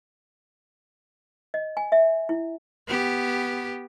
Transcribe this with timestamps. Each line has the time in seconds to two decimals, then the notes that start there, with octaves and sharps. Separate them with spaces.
1.54 D#5
1.77 G#5
1.92 E5
2.29 E4
2.87 B3 G4